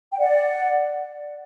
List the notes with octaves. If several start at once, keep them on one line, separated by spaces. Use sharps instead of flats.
G5
D5 F#5